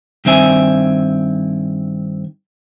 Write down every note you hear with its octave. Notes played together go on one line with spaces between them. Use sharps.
G2 D#3 C4 E5 G#5